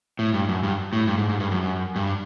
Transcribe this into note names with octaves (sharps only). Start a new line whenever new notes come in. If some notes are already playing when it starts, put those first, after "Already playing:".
A2
G2
F#2
G2
A2
G2
G#2
G#2
G2
F#2
G2